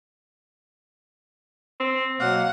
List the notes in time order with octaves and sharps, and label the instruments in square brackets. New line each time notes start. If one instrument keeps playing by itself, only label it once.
[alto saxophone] C4
[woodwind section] B2 F#3 A#3 [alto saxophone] F5 [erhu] F#5